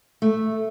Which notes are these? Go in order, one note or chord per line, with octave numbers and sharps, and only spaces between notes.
A3